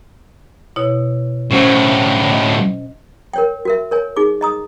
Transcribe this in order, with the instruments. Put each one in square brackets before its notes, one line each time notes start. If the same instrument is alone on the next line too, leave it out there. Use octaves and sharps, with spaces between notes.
[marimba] B2 E4 C#5
[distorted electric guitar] A2 F#3 [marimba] C#4 C5
[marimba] D#5
[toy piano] A#4 C#5 G5
F#4 A#4 E5
A#4 C#5 G#5
D#4 G#4 D6
D#5 A#5 D#6